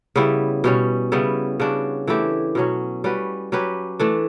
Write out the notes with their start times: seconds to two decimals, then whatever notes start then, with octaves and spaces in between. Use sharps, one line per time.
0.16 C#3 G3 B3 E4
0.64 B2 G3 C#4
1.12 C#3 G3 B3 E4
1.60 C#3 G3 D4 F#4
2.08 E3 A3 E4 G4
2.55 B2 F#3 C#4
3.04 G3 C#4 F#4 B4
3.52 F#3 C#4 G4 B4
4.00 E3 A3 D4